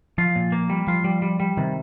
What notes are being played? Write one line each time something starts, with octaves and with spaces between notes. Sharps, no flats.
F3 F4
A#2
A#3
G3
F3 F4
G3
G3
G3
C3 D#3